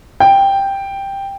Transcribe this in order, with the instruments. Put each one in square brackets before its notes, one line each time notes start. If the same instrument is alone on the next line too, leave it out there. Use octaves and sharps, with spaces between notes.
[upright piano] G5